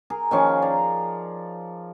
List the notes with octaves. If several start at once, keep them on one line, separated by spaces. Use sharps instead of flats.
G#4 A#4
D#3 F3 C#4 G#4
D5 A#5